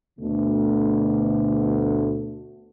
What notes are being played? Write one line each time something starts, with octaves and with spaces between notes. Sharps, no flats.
D2 B2 D3 A3